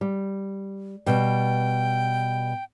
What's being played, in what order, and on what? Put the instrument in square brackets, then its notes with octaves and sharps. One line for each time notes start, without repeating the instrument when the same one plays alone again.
[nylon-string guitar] G3
[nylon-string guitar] B2 G3 [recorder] G5